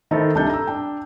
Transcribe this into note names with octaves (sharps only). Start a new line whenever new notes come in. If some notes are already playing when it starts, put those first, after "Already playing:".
D#3 D#4 E4 A4 C5
C2 D4 D#4 A4 A5 G6
A#5 E6
D4 G5